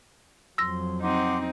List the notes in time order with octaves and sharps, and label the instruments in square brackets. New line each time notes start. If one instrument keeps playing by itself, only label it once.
[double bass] F2 F#3 [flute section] C6 [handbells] E6 A#6
[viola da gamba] C4 D#4 [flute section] F#5 C6 D6